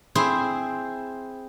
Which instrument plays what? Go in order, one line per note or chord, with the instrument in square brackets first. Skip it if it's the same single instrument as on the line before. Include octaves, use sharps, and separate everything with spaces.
[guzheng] C4 E4 G#4 C5